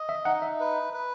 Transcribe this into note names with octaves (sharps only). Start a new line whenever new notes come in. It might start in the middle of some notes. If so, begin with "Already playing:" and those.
Already playing: D#5
E5
D#4 F#5
E5
B4
B4